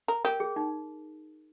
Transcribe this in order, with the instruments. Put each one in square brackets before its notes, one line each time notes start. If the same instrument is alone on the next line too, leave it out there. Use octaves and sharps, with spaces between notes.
[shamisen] A#4
[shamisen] G4 [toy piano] A#4
[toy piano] G#4
D#4